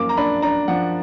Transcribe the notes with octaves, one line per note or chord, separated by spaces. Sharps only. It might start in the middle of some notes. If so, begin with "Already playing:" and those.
Already playing: F#2 F3 A#3 D6
A#5
D4 B5
D4 A#5
F3 F#5